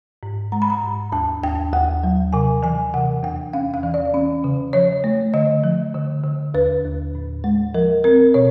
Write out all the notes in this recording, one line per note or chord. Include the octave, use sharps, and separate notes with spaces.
G#2
G#3 A#5
B5
A#5
G#2
D#2 A5
D#2 G5
D#2 F#5
F#3
C3 G#5
E3 G#5
C3 F#5
E2 G5
C#4 F5
F5
E3
D5
C#4
C#3
F3 C#5
A3
D3 D#5
F3
D3
D3
D#2 B4
D#2
A2
G#3
F3 A#4
C4 A#4
B2 C#5